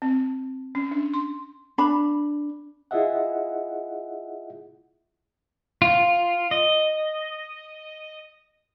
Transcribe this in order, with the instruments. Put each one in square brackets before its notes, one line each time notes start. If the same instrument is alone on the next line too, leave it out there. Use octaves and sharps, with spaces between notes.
[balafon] C4
C#4
D4
C6
[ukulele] D4 B5
[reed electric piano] E4 F4 G#4 D#5 E5 F#5
[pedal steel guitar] F4
D#5